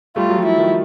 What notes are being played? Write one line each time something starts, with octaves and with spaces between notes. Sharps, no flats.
G3 A3 F4
F#3
F3 G3
E4
D#3 F3